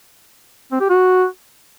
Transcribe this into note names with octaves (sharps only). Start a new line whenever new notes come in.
C4
G4
F#4